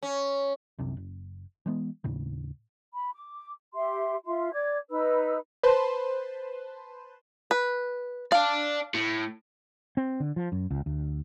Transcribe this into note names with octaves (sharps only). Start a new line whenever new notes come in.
C#4
C2 F#2 C3
F#1
E3 G#3 B3
D#2 A2 C#3
B5
D6
G4 E5 C6
F4 E5 C6
D5 D6 G#6
D#4 B4 B5 E6
B4 C5 A5 C6
B4
D5 F5 A5
A2
C4
D3
F3
F#2
C#2
D2